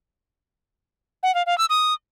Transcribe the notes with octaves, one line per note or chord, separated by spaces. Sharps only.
F#5
F5
F5
E6
D#6